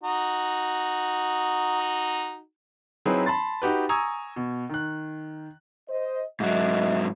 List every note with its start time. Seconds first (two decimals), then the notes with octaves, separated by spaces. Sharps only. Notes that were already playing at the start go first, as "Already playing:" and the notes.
0.03 D#4 F#4
3.06 F#3 C4 D#4 E4 G#4 B4
3.26 A5 B5 C6 A6
3.62 D#4 F#4 G4 B4
3.89 G#5 A#5 C#6 D#6 E6 G#6
4.36 B2
4.69 D#3 F#6
5.90 C5 D#5
6.40 G#2 F#3 D#5 E5